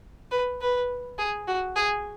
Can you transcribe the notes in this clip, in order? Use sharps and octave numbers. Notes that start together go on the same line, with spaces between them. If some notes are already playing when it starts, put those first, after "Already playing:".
B4
B4
G#4
F#4
G#4